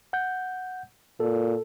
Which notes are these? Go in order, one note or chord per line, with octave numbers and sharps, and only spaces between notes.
F#5 G6
A#2 A4